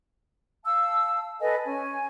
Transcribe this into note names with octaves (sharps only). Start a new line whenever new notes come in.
F5 A5 E6
A4 B4 D#5 G#5
C#4 G#5